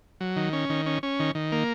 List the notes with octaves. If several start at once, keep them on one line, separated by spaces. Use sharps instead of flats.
F#3
D#3
C#4
D#3
C#4
C#4
D#3
D#3
A#3